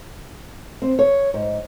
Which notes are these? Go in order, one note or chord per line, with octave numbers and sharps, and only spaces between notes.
C4
C#5
G#2